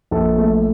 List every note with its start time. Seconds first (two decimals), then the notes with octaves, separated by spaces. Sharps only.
0.11 A#1 A4
0.38 A3